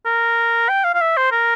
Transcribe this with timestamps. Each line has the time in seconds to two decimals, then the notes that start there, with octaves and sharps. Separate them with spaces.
0.05 A#4
0.69 G5
0.84 F5
0.94 F5
1.01 E5
1.17 C5
1.32 A#4